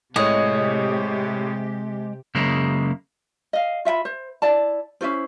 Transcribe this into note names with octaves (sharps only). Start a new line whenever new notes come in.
A2 C3 G#3 G4 C#5 D#5
F#2 C#3 G#3 A#3 E4
D#5 F5
F4 E5 F#5 B5
C5
E4 D5 A5
C#4 E4 F4 C5